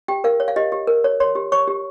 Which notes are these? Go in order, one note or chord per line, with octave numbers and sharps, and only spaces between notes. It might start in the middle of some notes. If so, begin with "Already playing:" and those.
G4 G5
A#4 F5
C#5
F5
G4 D#5
G4
A#4
C#5
C#5 C6
G4
C#5 C#6
G4